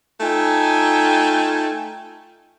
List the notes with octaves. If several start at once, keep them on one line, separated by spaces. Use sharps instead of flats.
A3 D#4 F4 A4 G5 G#5